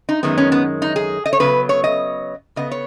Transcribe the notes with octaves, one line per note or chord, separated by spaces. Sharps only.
D#4
F#2 D#3 G#3 B3
C#4
B3
D#4
G#4
D#5
C#5
C#3 F#3 B3 B4
C#5
D#5
C#3 B3 D#5
C#5